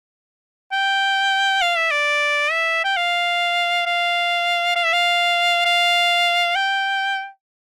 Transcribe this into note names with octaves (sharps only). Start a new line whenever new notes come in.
G5
F5
E5
D5
E5
G5
F5
F5
F5
E5
F5
F5
G5